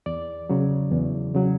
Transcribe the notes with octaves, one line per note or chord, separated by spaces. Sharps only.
E2 D5
C#3 F#3
E2
C#3 F#3